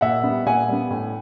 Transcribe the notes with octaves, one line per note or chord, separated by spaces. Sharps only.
A#2 E5 F#5
B3
G3
A#2 F#5 G#5
G3 B3
A2